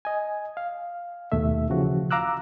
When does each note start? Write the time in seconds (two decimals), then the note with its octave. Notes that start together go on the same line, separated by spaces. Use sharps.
0.05 D#5 G#5
0.57 F5
1.32 D#2 B2 A3 E5
1.70 C#3 E3 F3 F#4
2.11 F5 A#5 D6 E6 F#6